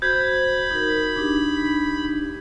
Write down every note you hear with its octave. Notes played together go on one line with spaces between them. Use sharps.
F#4 C5 B5 G6 G#6
D#4 F#4 A#4
D4 D#4 G4